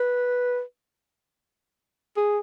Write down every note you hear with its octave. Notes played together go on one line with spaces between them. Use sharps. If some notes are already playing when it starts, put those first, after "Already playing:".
Already playing: B4
G#4